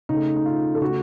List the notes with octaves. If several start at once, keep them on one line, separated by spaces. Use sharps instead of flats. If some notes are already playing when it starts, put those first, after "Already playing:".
C#3 A3 D#4
D#4
F4
A4
C#3 A3 F#4